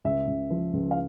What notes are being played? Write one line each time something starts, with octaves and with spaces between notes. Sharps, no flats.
C#2 E5
C#2
F3
C#2
F5